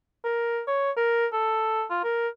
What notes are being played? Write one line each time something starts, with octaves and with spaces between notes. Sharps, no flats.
A#4
C#5
A#4
A4
F4
A#4